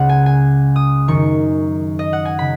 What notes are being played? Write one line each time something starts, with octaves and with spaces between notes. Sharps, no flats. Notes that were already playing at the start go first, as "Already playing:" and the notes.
Already playing: C#2 C#3 F#5
G#5
G#5
D#6
F#2 D#3 C#6
D#5
F#5
G#5
C#3 B5